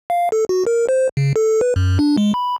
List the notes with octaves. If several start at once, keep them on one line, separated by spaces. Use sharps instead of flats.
F5
A4
F#4
A#4
C5
C#3
A4
B4
F#2
D4
G#3
B5